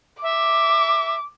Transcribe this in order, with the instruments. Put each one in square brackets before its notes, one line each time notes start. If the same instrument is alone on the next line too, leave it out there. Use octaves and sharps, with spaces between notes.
[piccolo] E5 [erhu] D6